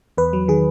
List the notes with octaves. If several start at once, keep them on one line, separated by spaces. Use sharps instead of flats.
E2 B4
F#3
D#3 G#4